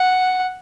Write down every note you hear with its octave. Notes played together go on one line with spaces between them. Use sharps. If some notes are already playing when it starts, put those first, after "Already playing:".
Already playing: F#5